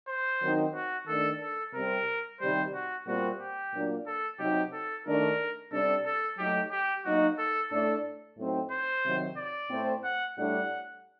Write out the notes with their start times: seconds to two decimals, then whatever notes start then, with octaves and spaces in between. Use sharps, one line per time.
0.08 C5
0.42 D#3 F#3 C4 D#4
0.75 F#4
1.08 D#3 A3 D4 A4
1.41 A4
1.74 C3 G3 C4 A#4
2.41 C3 D#3 G3 C5
2.74 F#4
3.07 A#2 G3 C4 F#4
3.40 G4
3.73 A#2 F#3 A#3 D4
4.07 A4
4.39 C3 F#3 C4 D#4 G4
4.73 A4
5.06 D#3 A3 D4 A#4
5.72 C3 G3 D4 A4
6.06 A4
6.38 F#3 A3 D#4 G4
6.71 G4
7.04 F#3 A#3 D#4 F#4
7.38 A4
7.71 A2 A3 D4 A4
8.38 A2 F#3 C4 D#4
8.71 C5
9.04 C3 D#3 F#3
9.37 D5
9.71 A2 A3 C4
10.04 F#5
10.37 A2 G3 D4 F#5